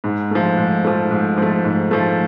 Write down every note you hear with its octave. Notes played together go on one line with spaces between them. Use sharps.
G#2
F3 A3
G#2
F3 A3
G#2
F3 A3
G#2
F3 A3